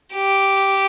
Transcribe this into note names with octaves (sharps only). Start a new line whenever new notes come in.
G4